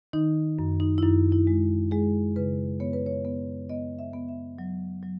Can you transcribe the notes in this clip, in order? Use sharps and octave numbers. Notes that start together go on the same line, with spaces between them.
D#3 D#4
F#2
D#4
E4
F#2 D#4
E4
G#3
G#3 G#4
C#3 B4
B3 C#5
B4
C#5
B3
B3 D#5
E5
B3
E5
F#3
F#3